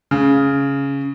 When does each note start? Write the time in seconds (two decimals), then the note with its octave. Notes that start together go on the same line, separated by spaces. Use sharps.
0.11 C#3